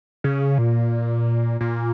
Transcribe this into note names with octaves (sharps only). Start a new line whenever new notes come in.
C#3
A#2
A#2